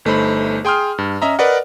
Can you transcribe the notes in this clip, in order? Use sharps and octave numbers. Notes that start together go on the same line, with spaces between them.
G1 A3 D#4 C5 B5
G#4 G5 C6 D#6 F6
G2
C#4 D#5 E5 A#5
A#4 B4 D5 D#5 F#5